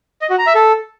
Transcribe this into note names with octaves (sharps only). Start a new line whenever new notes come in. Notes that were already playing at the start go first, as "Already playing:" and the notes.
D#5
F#4
A#5
E5
A4